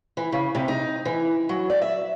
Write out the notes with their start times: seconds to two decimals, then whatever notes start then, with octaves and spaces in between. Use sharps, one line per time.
0.17 E3
0.32 C#3
0.55 C3
0.68 D#4
1.05 E3
1.49 F#3
1.70 D5
1.82 E5